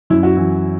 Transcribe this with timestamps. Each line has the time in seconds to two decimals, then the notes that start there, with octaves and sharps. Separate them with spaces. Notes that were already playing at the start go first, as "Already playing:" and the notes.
0.10 F#2 E4
0.23 F#4
0.37 E3 E4